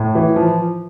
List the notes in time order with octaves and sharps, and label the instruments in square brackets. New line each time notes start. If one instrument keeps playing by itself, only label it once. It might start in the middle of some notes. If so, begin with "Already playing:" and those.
Already playing: [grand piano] A2
E3
F3